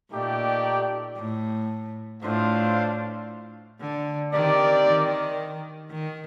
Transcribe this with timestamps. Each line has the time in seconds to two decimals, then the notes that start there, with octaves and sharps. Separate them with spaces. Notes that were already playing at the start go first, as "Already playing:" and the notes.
0.11 A#2 A3 D#4 G4 D5 G5
1.16 A2
2.22 A2 A3 D4 F4 C5 F5
3.80 D3
4.32 D#3 C4 G4 A#4 D5
4.85 D#3
5.90 D#3